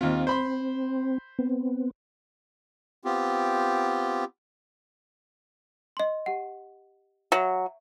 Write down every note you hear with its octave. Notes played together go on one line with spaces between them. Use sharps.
D#2 C4 F4
C5 B5 C6
B3 C4
B3 C4 F4 G4
D#5 C6
G4 F#5
F#3 E5